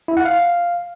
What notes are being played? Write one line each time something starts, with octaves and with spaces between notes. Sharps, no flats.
E4
F#5
F5